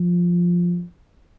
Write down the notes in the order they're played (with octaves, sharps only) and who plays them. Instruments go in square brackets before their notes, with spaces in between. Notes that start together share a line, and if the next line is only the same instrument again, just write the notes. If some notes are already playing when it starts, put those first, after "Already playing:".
Already playing: [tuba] F3